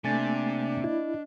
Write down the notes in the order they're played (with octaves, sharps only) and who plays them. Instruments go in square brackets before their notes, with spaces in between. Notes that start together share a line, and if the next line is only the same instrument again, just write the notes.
[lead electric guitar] C3 [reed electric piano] A3 G#5 A6 [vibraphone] A#3 E5 [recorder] D4
[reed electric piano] E4 [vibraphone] D#5